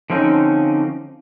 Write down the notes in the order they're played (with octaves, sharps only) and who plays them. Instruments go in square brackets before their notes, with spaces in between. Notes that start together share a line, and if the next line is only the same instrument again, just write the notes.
[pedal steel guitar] D3 F3 C4 C#4 D#4